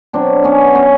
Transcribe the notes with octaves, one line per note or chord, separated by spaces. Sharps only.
B2 F#3 C4 D4
B3 C#4
B3 C#4